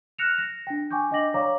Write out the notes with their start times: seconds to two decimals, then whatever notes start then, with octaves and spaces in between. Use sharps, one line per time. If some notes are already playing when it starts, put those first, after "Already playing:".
0.19 F6 F#6 A#6 C#7 E7 F7
0.38 A#6
0.67 D4 G5
0.91 G5 G#5 C#6 D6 G6
1.11 D4 D#5 G5 D6 A#6 F#7
1.34 C#5 D5 F5 A#5 C#6 D6